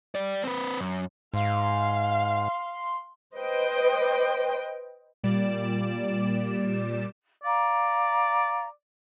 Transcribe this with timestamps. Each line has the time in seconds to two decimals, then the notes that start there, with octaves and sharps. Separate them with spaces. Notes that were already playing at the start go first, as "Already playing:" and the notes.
0.15 G3 D5
0.44 C4 B4
0.79 F#2
1.34 G#2 F5 C6
3.36 B4 C5 D#5 G5
5.24 A#2 G3 D5 E7
7.44 D5 F5 A#5